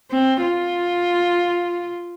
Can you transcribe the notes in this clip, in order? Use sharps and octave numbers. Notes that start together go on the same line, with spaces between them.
C4
F4